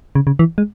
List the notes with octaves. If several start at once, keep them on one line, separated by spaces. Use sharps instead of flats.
C#3
C#3
E3
G#3